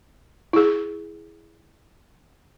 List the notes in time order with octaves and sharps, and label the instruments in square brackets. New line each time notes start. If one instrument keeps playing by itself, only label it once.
[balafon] E4 G#4